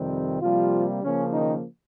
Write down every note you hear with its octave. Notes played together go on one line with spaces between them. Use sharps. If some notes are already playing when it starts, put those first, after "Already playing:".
Already playing: F2 C3 D#3 G3 C4
C3 F3 G3 A#3 F4
C#3 F3 A#3 C#4
D#3 D#4